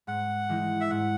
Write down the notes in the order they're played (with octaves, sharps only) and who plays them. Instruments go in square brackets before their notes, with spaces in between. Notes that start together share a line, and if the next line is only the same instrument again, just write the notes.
[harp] G#2 [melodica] F#5
[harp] E3 G#3 D#4
[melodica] E5
[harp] G#2 [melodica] F#5